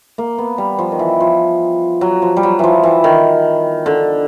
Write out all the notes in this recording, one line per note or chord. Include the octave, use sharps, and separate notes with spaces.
A#3
B3
G3
F3
D#3
E3
F3
F#3
F3
G3
F#3
E3 F3
E3
D#3
D3